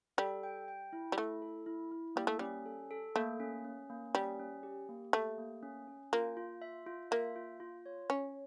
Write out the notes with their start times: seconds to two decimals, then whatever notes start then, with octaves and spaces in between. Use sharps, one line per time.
0.18 G3 A4
0.43 G5
0.68 G5
0.93 E4
1.12 G3
1.17 A3 E4
1.42 A4
1.66 E4
1.91 E4
2.16 G3 A#3
2.27 A3
2.39 G3 C#4
2.66 A4
2.91 A4
3.15 A3 A#3
3.40 C#4
3.65 C#4
3.90 A#3
4.15 G3 C#4
4.39 C#4
4.63 G4
4.89 A#3
5.13 A3 G4
5.38 A#3
5.63 C#4
5.87 C#4
6.13 A#3 F4
6.37 F4
6.62 E5
6.87 F4
7.11 A#3 E5
7.36 F4
7.60 F4
7.86 C#5
8.10 C#4 C#5